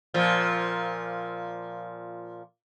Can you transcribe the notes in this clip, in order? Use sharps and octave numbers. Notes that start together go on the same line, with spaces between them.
A#2 F3